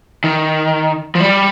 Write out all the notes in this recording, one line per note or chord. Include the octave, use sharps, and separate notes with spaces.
D#3
F3
G3